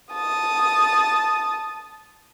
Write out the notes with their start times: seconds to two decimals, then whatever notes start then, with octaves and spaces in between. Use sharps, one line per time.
0.13 A5 D#6